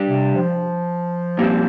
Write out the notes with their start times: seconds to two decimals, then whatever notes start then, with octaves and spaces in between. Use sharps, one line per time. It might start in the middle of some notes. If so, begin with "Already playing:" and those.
Already playing: G3 D4 G4
0.09 C3
0.35 F3
1.39 A#2 G3 C4